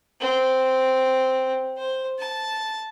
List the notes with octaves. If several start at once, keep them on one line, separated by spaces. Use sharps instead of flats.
C4
C5
A5